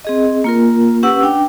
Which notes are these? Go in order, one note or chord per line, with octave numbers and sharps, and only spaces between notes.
C4 G#4 D#5
A#3 F4 A#4
C#4 G4 B4 F#5 E6
D4 G5